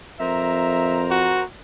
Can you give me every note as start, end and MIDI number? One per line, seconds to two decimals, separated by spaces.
0.20 1.45 41
0.20 1.43 70
0.20 1.43 72
0.20 1.06 76
0.20 1.43 82
1.11 1.45 66